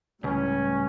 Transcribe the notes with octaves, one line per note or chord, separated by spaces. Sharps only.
C#2 A2 G3 C#4